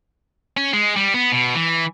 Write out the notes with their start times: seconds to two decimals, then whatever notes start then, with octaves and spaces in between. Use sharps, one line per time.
0.57 C#4
0.73 G#3
0.96 G3
1.14 B3
1.32 B2
1.55 E3